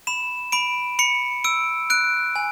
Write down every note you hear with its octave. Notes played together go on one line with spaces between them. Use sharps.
B5 E7
B5 D7
B5 C#7
E6 D7
F#6 D7
G#5